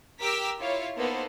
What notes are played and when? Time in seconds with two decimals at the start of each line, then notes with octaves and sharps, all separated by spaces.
0.20 G4 A#4 D6 E6 B6
0.59 E4 F4 C#5 F5
0.97 A#3 B3 D#4 A4 C5